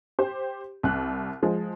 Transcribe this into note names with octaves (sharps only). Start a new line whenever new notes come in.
G4 C5
C2 F#6
F3 G#3